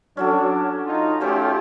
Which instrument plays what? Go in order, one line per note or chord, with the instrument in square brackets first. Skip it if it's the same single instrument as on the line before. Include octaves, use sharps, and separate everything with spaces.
[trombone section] F#3 D4 [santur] C#4 F#4 A4
[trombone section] D#4 F4
[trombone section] A3 F4 G4 [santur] C#4 C5 G#5